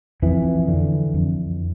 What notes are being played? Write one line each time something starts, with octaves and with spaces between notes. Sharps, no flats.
F2 E3
D3
F2